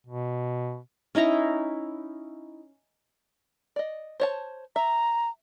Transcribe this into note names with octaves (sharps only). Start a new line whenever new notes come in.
B2
C#4 D#4 E4 A#5
D5 D#5
C5 C#5 A5
E5 A#5